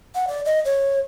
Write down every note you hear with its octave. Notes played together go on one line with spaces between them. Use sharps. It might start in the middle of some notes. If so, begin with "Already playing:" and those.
F#5
D5
D#5
C#5